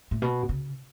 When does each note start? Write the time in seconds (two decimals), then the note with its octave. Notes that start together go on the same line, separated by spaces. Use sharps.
0.11 A2
0.22 B2
0.49 C#3